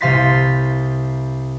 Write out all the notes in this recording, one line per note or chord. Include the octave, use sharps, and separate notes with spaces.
C2 C3 F5 C6 A6 B6